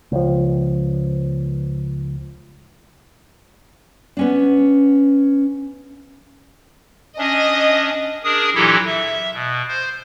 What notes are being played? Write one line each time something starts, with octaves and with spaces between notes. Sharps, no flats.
C#2 F3
B3 C#4 D4
C#4 D4 D#5
D4 G#4 A#4 D#6
A#2 E3 F#3 E4 G4 A4
E5
B2
C5